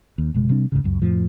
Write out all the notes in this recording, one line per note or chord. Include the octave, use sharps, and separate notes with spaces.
D#2
F#1 B2 G#3
C3 G3 C4 D4
C#2 G#2 C#3
C#2 F#2
F2 A2 F3